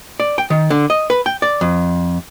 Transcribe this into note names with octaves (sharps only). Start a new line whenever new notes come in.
D5
G5
D#3
D3
D#5
B4
G5
D5
F2